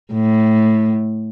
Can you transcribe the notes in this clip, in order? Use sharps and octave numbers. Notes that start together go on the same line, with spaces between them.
A2